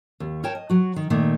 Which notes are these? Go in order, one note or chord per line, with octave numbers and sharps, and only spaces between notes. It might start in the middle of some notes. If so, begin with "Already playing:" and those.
D#2
A#4 C#5 G5 A5
D#5
F#3 F#4
D#3
A#2 D#3 A3 A#3